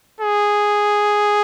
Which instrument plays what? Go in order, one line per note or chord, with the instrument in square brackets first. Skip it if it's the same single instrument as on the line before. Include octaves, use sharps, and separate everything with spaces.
[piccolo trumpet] G#4